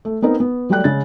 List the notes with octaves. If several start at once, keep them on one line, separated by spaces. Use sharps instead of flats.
A3
B3 C4 D#4 A#4
B3
F#3 G3 A3 D5 G5 F#6
C#3 G#3 A6